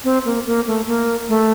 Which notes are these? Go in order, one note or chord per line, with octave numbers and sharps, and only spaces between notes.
C4
A#3
A#3
A3
A#3
A3